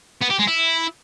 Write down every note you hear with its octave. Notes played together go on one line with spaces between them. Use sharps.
B3
G4
G#3
E4